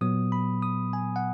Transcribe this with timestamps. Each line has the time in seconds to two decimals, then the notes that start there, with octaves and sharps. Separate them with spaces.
0.01 A#2 F#3 B3 D#6
0.32 B5
0.62 D#6
0.93 G#5
1.16 F#5